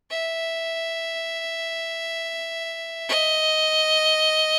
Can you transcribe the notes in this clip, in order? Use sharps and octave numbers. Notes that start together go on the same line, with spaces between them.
E5
D#5